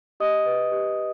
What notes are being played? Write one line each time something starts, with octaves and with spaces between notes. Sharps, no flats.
G4 D#5 D#6
B4
G4